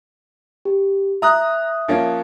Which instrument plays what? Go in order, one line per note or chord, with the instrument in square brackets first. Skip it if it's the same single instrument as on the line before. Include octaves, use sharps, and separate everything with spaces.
[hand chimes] G4
[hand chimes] E5 [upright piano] A#5 D#6 F#6
[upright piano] F3 A#3 C#4